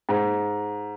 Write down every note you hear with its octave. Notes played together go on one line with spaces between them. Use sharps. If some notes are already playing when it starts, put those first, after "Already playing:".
G#2